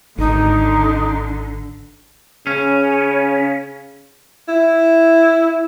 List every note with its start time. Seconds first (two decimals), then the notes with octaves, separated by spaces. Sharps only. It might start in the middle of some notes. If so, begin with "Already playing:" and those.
0.18 G#1 D3 D#4
2.47 C#3 C#4
4.48 E4